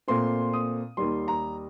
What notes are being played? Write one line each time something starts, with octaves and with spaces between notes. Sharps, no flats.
A#2 A3 C4 C6
D#6
D#2 D#3 G3 C6
A#5